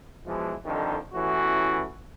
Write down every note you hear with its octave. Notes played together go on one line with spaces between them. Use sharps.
B2 E3 F3 G#3
F2 D3 D#3 G3 D4 D#4
A1 A2 E3 B3 C#4 F#4